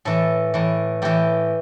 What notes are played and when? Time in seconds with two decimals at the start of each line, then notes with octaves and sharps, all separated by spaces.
0.05 A2 E3 A4
0.54 A2 E3
1.02 A2 E3 G4